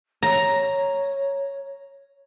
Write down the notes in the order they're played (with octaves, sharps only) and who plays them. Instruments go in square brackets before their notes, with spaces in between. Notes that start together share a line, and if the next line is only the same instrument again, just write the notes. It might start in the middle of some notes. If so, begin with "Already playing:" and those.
[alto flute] C#5 [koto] A#5